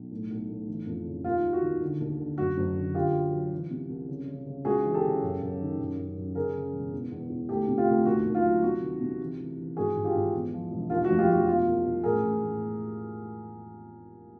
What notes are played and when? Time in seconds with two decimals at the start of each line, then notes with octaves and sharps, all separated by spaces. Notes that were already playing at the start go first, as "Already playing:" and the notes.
Already playing: B1
0.11 A2
0.30 B1
0.49 A2
0.68 E3
0.86 F2
1.05 C#3
1.24 D#2 F4
1.44 G3
1.53 F#4
1.62 D#3
1.81 D3
2.00 D#2
2.20 D3
2.38 F#1 F#4
2.57 F#1
2.75 D3
2.94 D3 F4 G4
3.13 F#3
3.33 F#3
3.51 E3
3.71 C3
3.89 C2
4.08 C#3
4.28 C#3
4.46 C#3
4.65 C#2 F#4 G#4
4.85 E3
4.94 G4 A4
5.04 C#3
5.23 F#2
5.42 F#2
5.60 D#3
5.79 F#2
5.98 F#2
6.17 F#2
6.35 C#3 G#4 A#4
6.54 C#3
6.73 E1
6.93 E2
7.12 E2
7.30 E2
7.49 D2 G4 A4
7.68 C3
7.78 F4 G4
7.87 D2
8.06 D#2 F#4
8.25 D#2
8.35 F4
8.44 F#3
8.63 C3 F#4
8.82 D#3
9.01 C3
9.20 E3
9.39 E3
9.58 E3
9.76 G#1 F#4 G#4
9.95 G#1
10.05 F4 G4
10.14 G#1
10.33 E2
10.52 F3
10.71 E1
10.90 D#2 F4
11.04 F#4
11.09 F1
11.18 F4 G4
11.28 F1 F#4
11.47 B2 F4
11.66 C2
11.85 C2
12.03 A1 G#4 A#4
12.23 A1
12.42 A1